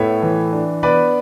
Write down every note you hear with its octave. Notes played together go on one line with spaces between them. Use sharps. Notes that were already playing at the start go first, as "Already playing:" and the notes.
Already playing: A2 B3 C#5 E5
E3
D4
B3 B4 D5